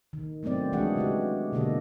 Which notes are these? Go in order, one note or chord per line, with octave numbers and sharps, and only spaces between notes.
D#3
F#3 A3 B3 C4 D5
E3 G#3 D4 F#4 G#4 F#5
C#3 F#4 G4
B2 D3 A#3 G4 A4 D#5